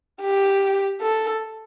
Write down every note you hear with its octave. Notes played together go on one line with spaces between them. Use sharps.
G4
A4